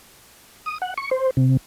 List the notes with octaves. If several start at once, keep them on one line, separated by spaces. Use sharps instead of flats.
D#6
F#5
C#6
C5
C3